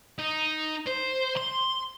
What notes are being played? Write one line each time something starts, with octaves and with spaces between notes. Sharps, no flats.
D#4
C5
C6